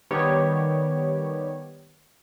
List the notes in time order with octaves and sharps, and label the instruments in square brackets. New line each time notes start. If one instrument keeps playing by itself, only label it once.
[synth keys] D#3 G3 B3 G4 C#5